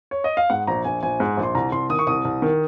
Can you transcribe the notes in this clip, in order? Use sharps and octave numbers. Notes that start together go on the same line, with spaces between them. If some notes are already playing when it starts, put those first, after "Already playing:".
C#5
D#5
F5
G#2 F#5
A#1 A#5
A#1 G#5
A#1 G#5
G#2
A#1
C6
C2 A#5
C2 C6
D#3 D#6
C#6
C2 D#6
C2
D#3